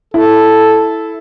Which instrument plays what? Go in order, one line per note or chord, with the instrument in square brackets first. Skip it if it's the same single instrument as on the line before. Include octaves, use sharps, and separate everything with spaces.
[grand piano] E4 [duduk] A4